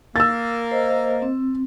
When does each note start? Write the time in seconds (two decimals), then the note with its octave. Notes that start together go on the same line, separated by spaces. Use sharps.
0.16 A#3 E6 A6
0.71 C5 D#5
1.22 C4